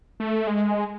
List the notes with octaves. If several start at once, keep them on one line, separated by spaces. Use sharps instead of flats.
A3
G#3